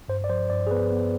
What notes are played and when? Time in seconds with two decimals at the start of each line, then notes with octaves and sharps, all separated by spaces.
0.08 G2 C5
0.24 D5
0.29 F3 C5
0.50 G2 D5
0.67 G#4
0.71 B3 B4
0.92 B3